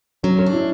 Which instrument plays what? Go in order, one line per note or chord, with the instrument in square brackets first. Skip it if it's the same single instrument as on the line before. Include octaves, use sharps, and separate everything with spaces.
[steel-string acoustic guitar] F#3 [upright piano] C#4
[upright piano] C#4
[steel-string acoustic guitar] D4
[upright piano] E4